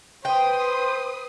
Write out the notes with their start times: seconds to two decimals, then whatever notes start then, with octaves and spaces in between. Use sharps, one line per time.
0.25 B4 C5 G5 C6 D#6